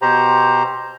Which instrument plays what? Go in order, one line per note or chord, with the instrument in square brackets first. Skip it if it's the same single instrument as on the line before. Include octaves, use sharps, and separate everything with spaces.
[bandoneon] B2 G4 C5 A#5